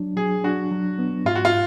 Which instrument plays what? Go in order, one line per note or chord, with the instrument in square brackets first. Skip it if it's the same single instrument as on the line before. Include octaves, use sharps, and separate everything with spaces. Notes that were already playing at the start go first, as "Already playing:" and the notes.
Already playing: [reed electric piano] F#3 D4
[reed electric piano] F#3 [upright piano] G#4
[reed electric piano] D4 [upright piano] F#4
[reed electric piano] F#3
B3
[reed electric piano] G#2 [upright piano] F4
[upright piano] F#4
F4